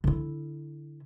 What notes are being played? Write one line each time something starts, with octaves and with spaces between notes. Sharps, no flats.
D3 E4